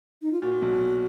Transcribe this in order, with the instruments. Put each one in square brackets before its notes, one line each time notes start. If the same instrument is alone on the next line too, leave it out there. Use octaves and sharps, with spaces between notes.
[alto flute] D#4
F4
[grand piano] A#2 [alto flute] F#4
[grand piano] A#2
B1 B2
A#2